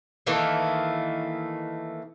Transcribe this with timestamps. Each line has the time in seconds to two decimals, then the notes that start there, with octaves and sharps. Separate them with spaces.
0.26 D#3 E3 A3 A#3